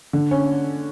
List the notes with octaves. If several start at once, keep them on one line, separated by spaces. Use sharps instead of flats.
D3
C#4